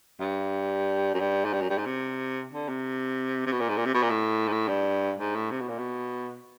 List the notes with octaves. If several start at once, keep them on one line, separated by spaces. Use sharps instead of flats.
G2
F#2
G2
G#2
G2
F#2
G2
G#2
C3
D3
C3
C3
B2
A#2
G#2
A#2
C3
B2
A#2
A2
G#2
A2
G2
G#2
A2
C3
B2
A#2
B2